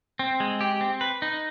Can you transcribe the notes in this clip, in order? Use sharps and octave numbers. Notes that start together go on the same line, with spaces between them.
C4
G#3
G4
C4
B4
D#4